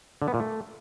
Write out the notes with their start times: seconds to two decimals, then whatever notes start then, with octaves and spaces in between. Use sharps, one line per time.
0.22 D3
0.28 B3
0.34 A#2
0.40 A3